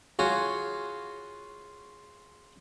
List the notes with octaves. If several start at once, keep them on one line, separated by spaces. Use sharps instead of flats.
F4 F#4 G#4 C#5